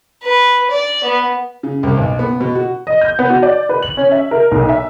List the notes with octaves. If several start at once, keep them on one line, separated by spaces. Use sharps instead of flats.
B4
D5
B3
C#3
C2
B1
B3
B2
F#4
D#5
G6
B3
F#4
D5
B4
F#7
C#4
E5
A#4
B1
E5